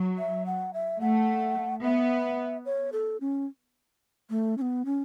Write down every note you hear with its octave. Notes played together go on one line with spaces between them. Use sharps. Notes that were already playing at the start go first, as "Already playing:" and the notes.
Already playing: F#3
E5
F#5
E5
A3 F#5
B3 E5
C#5
A4
C#4
A3
C#4
B3
C#4